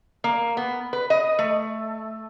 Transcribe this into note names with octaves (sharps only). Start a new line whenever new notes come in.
A#3
B3
B4
D#5
A3